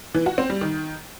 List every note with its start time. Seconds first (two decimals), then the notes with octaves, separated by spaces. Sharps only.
0.14 E3
0.26 F#4
0.38 C4
0.50 G3
0.61 D#3